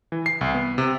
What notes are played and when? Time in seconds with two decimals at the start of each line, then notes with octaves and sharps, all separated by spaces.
0.12 E3
0.26 C7
0.41 C2
0.55 B3
0.78 C3